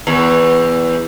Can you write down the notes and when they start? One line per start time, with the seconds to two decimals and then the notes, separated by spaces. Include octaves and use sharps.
0.07 E2 E3